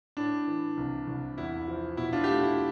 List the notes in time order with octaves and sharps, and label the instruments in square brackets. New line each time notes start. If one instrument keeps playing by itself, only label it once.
[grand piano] A2 D4
E3
C2
C2
E2 E4
F3
B2 E4
D4 F4
G4
A3 D4 F4
E4